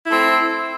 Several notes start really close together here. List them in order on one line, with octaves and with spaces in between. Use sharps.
E4 A3 C4